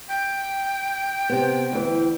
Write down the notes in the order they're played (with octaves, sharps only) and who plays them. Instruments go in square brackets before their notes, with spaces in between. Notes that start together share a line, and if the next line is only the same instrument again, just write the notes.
[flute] G5
[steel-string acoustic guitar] C3 B3
D2 E3